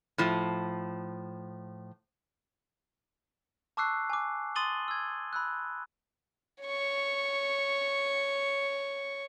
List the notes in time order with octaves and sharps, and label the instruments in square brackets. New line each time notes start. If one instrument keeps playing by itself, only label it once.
[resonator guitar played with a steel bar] A2 F3
[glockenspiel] A5 C#6 D6 E6 F#6 C7
G#5 D6
C6 D#6 A6 D#7 F#7 G7
E6 G#6
B5 E6 F#6
[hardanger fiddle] C#5 C#6